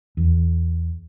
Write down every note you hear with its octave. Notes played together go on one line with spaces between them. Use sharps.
E2